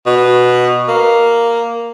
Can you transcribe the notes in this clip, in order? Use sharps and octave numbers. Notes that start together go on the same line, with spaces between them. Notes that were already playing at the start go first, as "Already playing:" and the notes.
B2
A#3